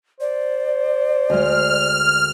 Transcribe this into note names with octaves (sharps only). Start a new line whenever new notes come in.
C5 D5
D2 G#3 F6